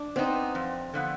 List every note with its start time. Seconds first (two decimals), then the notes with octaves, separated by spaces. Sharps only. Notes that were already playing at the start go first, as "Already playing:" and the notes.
Already playing: D4
0.16 B3 C4 D#4
0.55 F2
0.94 D3 F3 B3